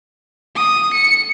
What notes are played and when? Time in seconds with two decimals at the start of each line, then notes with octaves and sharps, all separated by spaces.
0.56 D#6
0.94 C#7